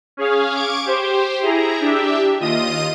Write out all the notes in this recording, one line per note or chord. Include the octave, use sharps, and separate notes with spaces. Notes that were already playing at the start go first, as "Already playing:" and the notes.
C#4 G#4 C#5 F5
C#6 D6 G#6 D7
G4 C5
E4 G#4 A#5
D4 G4 E5
D#2 F4 D#5 D#6 D#7